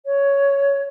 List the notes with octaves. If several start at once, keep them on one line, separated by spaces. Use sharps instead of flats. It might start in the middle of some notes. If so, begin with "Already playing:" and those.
C#5